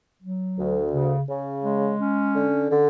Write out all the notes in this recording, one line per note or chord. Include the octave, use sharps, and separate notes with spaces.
F#3
D2
C#3
C#3
G#3
C#4
D3
D3